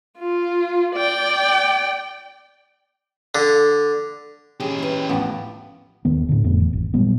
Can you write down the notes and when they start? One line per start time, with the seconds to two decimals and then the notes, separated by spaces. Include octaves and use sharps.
0.18 F4
0.95 D5 G5
3.35 D3
4.60 C#4 G4 G#4 G5
4.79 E4 B4
5.09 A1 E2 D3 F3 B3
6.05 D#1 D#3 B3
6.29 A2 D3
6.44 F1 F2 A3 B3
6.60 E2
6.73 G#1
6.94 A#2 F#3 G3 B3